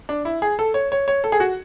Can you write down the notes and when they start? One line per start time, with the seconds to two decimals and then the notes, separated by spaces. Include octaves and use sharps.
0.09 D4
0.25 E4
0.42 G#4
0.59 A4
0.74 C#5
0.92 C#5
1.08 C#5
1.24 A4
1.32 G#4
1.40 F#4